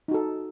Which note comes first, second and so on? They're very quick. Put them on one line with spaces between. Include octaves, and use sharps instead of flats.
D#4 F#4 A4